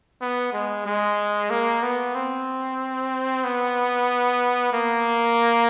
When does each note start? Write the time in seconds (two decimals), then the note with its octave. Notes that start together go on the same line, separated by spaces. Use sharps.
0.21 B3
0.53 G#3
0.86 G#3
1.50 A#3
1.82 B3
2.15 C4
3.44 B3
4.73 A#3